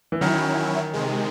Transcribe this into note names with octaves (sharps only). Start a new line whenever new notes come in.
E3
D#3 F#3 C#4 E4
C3 D#3 G#3